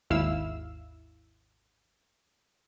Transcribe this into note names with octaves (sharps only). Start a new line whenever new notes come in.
G#1 D#2 E4 F5 E6 E7